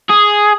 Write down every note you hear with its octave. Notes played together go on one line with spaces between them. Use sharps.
G#4